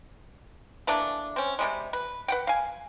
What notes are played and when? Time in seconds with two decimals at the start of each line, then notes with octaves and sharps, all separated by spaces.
0.87 E3 A3 A#3 D4
1.36 C4 C#4
1.59 C3 D#3 G3 G#3
1.93 B4
2.28 B4 F#5 G5
2.47 F5 G#5